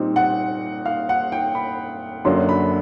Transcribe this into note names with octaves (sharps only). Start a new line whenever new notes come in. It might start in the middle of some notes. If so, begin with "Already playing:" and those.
Already playing: A#2 G3 C4 D#4
F#5
F5
F#5
G5
B5
F#2 D3 F#3 A#3 D4 C6
B5